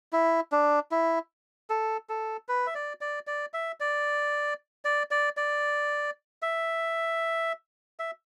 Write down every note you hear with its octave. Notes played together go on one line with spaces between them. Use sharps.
E4
D4
E4
A4
A4
B4
E5
D5
D5
D5
E5
D5
D5
D5
D5
E5
E5